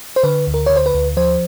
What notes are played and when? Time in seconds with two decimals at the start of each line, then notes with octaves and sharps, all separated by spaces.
0.16 C5
0.23 D3 B4
0.47 D2
0.54 A#4
0.66 D3 C#5
0.76 C5
0.86 B4
0.94 D2
1.17 F3 C5